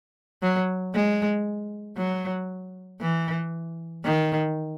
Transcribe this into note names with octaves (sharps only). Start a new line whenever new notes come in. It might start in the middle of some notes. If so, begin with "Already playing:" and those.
F#3
G#3
F#3
E3
D#3